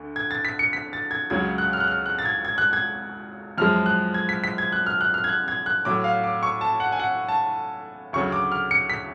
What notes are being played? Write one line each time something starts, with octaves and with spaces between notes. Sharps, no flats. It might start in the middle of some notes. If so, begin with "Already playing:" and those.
Already playing: D2 D3
G#6
A6
B6
C#7
B6
A6
G#6
C#2 C#3 F#3 G#6
F#6
F6
F#6
F6
F#6
A6
G#6
G#6
F#6
G#6
F#2 F3 G#3 F6
F#6
G#6
B6
B6
G#6
F#6
F6
F#6
F6
G#6
F#6
G#6
F#6
A2 F#3 D6
F5
D6
C#6
A5
F#5
G#5
F#5
A5
D2 C#3 F#3 C#6
D6
F6
C#7
B6